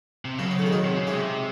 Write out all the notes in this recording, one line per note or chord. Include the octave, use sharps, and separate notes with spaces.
C3
F#2 C#3 F#3
C4
A3
D#3 G#3
F#2 F#3
C3
C#3
G#2 C3 G#3